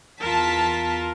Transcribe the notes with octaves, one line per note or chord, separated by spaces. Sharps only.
E2 F4 A#4 A5 B6